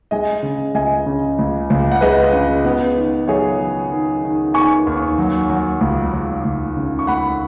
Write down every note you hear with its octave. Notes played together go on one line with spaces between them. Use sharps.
G#3 D#5 G#5
C#3
C#2 D#5 G#5
C#3
C#2
C#2
F#5
G#3 B4 D#5
C#3
B3
D#3
F#3 G#4 C#5
F#3
D#3
D#3
D#3 G#5 C#6
D#2
F#3
F#3
C#2
C#2
C#2
C#3
C#6
C#2 F#5 B5